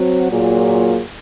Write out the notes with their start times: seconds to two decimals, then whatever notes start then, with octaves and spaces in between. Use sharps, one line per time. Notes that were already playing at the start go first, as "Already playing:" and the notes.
Already playing: F#3 C4 F#4
0.30 A#2 F#3 A#3 F4 G#4